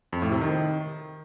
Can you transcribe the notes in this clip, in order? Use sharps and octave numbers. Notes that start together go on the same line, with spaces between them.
F2
A2
C3
D#3